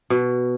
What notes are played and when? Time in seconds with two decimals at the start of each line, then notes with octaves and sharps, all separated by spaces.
0.10 B2